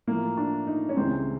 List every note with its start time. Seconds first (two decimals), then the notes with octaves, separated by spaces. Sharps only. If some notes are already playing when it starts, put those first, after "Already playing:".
0.07 A2 F3 A#3
0.37 D4
0.67 D#4
0.89 C#4
0.97 C#2 C#3 E3 G3 C4